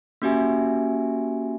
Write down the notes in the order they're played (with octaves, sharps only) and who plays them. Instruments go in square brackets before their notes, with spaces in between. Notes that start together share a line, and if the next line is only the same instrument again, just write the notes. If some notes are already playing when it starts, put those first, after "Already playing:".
[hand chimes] A#3 C#4 F#4 G4 E5 G#5